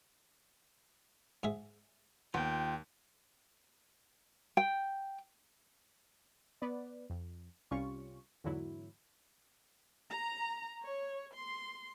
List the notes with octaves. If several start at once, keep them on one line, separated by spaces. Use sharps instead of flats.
G#2 G#4 E5
D#2 B3 F4 G5
G5
B3 B4 D5
F2
C2 G3 C#4 F4 C#6
E2 G#2 D3 F#3 E4
A#5
C#5
C6